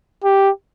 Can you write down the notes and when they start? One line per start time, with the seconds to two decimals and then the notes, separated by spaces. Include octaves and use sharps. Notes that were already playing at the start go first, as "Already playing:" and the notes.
0.24 G4